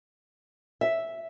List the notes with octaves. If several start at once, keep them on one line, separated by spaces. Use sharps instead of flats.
E5